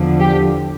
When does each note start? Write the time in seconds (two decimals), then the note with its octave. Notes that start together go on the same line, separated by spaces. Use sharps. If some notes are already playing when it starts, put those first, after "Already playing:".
Already playing: E2 D3 F3
0.20 G4